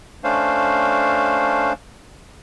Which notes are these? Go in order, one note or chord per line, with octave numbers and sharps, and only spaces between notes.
A3 C#4 D4 C5 F5